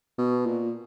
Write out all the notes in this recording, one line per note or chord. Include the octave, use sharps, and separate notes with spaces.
B2
A#2